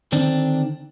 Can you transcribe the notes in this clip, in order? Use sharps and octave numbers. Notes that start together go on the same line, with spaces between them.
D3 D#3 C4 D4